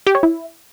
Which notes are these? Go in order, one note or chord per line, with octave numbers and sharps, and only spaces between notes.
G4
C#5
E4